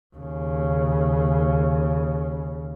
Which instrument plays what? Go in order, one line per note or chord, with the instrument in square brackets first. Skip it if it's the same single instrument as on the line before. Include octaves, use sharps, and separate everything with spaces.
[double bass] D#2 C#3